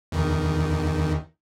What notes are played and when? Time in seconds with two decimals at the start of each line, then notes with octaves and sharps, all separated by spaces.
0.12 E2 D#3